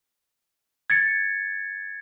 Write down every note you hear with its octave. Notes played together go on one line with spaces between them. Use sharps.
G#6 A6 C#7